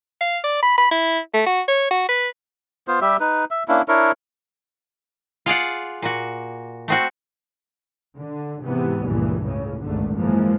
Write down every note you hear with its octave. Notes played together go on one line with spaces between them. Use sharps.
F5
D5
B5
B5
E4
A3
F#4
C#5
F#4
B4
B3 F4 C5
G3 G4 E5
D#4 B4
E5
A#3 C#4 D4 E4
D4 E4 A#4 C#5
F4 G#4 D5 F#5
A#2 F#4
A3 C4 F#4
D3
G#2 C3 E3 B3
C#2 G2 A#2 E3
C#2 A2 C#3
G#1 C#2 G2 A#2 D3 A3
F#2 E3 F3 G#3 A#3